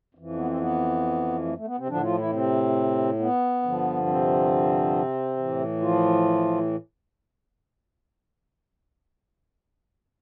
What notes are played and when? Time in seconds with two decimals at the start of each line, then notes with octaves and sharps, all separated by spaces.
0.15 F2 E3
0.36 B3
0.47 C4
0.59 B3
1.45 A3
1.56 A3
1.67 B3
1.78 C3 C4
1.89 A2 D3 F3 D4
2.03 F3 F4
2.18 E3 E4
2.32 C3 C4
3.20 B3
3.62 G2 D3 F3
4.06 C3 C4
5.37 A2 E3
5.80 F3 F4